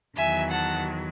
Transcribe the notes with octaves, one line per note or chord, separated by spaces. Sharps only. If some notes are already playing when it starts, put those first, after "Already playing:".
E2 D#3 F#3 E5 G#5
F#5 A5